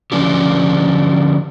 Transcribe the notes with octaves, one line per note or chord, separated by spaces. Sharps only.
D3 F3 C#4 D4 G4